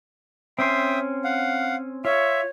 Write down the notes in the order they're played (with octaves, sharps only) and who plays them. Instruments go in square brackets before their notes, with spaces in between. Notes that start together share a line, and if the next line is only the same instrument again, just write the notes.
[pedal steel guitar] C4 C#4 C6 [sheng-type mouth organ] E5 G5 D#6
[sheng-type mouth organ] F5 F#5
[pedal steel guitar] F4 [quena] C#5 [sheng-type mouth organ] E5